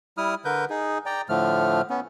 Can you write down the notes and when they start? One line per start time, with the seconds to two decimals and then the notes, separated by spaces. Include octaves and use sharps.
0.18 G3 E4 D#6 F6
0.45 D3 A#4 B4 G6
0.70 D#4 G#4
1.06 D5 G5 A#5
1.29 A2 D3 F3 A3 F6
1.90 B3 C#4